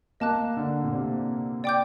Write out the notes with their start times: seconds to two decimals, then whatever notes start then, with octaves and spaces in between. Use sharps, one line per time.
0.20 A#3 D#5 A5 D6 F#6
0.57 D3
0.84 A#2
0.92 C3
1.64 D5 G5 D6 G6